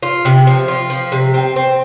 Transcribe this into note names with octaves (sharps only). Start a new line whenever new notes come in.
F4
C3
F3
F4
F3
C3
C4
C4